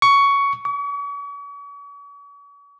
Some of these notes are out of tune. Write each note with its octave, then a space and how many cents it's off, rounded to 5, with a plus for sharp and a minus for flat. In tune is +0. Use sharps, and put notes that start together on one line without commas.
C#6 +15
C#6 +45